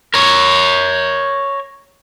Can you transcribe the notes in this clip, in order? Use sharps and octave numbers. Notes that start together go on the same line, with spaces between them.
A#4 C#5